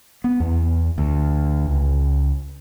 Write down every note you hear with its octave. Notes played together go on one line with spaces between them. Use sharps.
B3
E2
D2
C#2